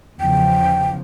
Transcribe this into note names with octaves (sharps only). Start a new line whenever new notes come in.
E2 C#3 F3 G5